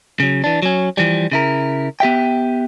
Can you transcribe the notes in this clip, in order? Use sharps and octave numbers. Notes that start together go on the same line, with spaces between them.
C#3 F#3
E3 D4
F#3 C#4
E3 F3 G3
C#3 E4 A#4
B3 G4 E5 G5